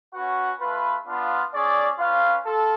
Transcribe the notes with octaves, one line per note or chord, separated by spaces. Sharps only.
C#4 F#4 B4 F#5
A3 F4 B4
B3 D4 F4
C#4 G#4 D5
C#4 F4 B4 F5
F4 A4